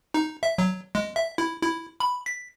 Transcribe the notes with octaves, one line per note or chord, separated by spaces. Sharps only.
D#4
E5
F#3
G#3
E5
E4
E4
B5
B6